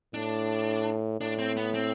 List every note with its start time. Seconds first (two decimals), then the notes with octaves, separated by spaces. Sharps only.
0.14 A2 D4
1.21 A2 D4
1.39 C4
1.57 B3
1.74 C4